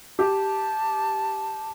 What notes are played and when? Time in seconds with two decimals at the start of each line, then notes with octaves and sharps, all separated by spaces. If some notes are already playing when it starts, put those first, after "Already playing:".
0.19 G4 A5